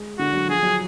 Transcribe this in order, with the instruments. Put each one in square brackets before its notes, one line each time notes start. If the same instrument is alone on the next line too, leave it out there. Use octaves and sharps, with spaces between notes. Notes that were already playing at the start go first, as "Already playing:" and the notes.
Already playing: [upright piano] G#3
[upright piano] D3 [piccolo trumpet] F#4
[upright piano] F#3
[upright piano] F3 [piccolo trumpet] G#4
[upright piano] F#3